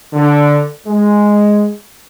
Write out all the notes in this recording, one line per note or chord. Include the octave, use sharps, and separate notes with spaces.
D3
G#3